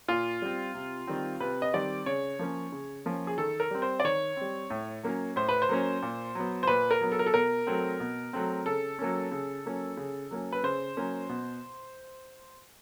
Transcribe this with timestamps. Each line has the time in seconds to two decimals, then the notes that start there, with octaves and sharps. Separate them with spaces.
0.08 A#2 F4
0.42 G3 C4
0.74 C3
1.07 D#3 G3 C4
1.40 C3 B4
1.62 D#5
1.74 D#3 G3 C4 D5
2.06 C#3 C#5
2.39 F3 A#3 C#4
2.72 C#3
3.06 F3 A#3 C#4
3.27 G#4
3.38 D#3 A4
3.60 A#4
3.71 G3 C4
3.82 C5
4.00 D5
4.04 D#3 C#5
4.37 G3 C4
4.70 A2
5.03 F#3 A#3 C#4
5.36 A2 C5
5.49 B4
5.62 C5
5.69 F#3 A#3 C#4
6.02 A#2
6.35 F#3 B3
6.63 C5
6.67 A#2 B4
6.91 A#4
7.01 F#3 B3
7.12 A4
7.19 A#4
7.26 A4
7.33 B2 A#4
7.67 F#3 A3 C4
8.00 B2
8.33 F#3 A3 C4
8.66 C#3 A4
8.99 F#3 A#3 C#4
9.32 C#3
9.65 F#3 A#3 C#4
9.97 C#3
10.31 F#3 A#3 C#4
10.52 B4
10.63 C#3 C5
10.97 F#3 A#3 C#4
11.29 B2